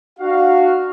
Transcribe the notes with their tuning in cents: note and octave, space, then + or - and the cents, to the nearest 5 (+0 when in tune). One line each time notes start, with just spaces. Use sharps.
D4 +30 F#4 +0 F5 +0